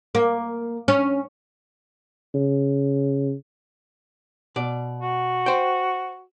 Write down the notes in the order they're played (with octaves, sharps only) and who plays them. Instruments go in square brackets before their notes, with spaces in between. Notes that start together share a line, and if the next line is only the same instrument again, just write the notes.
[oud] A#3
C#4
[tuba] C#3
[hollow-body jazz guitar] B2 D5
[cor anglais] F#4
[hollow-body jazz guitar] C5 G5